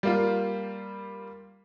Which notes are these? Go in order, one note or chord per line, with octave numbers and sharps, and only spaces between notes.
G3 A#3 F4